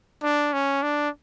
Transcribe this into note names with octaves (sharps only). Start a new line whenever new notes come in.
D4
C#4
D4